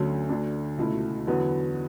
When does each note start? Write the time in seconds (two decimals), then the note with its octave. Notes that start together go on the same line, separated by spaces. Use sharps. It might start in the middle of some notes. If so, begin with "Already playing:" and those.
Already playing: D2 D3 F#3 A3 C#4
0.29 D2 D3 A3 D4
0.78 C#2 B2 A3 E4
1.27 E2 D3 F#3 B3 F#4